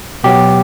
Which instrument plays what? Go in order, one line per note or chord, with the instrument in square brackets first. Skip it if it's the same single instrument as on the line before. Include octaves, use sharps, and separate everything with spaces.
[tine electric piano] B2 F#3 B3 G4